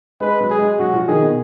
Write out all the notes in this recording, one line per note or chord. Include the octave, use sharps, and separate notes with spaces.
G#3 B4
F#3
G#4
G#3
F#3 F#4
F3
D#3 G#4
B2